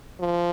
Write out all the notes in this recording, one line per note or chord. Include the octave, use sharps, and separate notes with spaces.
F3